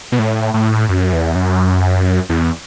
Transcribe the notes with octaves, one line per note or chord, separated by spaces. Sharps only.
B2
A2
A2
F#2
E2
F#2
E2